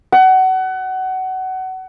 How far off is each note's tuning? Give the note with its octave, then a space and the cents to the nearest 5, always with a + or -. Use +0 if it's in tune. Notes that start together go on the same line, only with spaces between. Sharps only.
F#5 +25